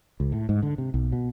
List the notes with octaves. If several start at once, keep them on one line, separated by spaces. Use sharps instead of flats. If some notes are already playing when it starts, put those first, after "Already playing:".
C#2
A2
G#2
D3
C3
B1
B2